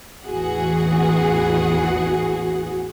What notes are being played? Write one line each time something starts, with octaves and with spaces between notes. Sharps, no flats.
A1 E2 E3 F#4 G#4 F#5